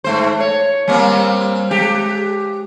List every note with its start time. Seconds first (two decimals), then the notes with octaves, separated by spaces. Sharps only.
0.04 G#2 A3 C5
0.40 C#5
0.88 G3 A#3 C4
1.71 G#3 G4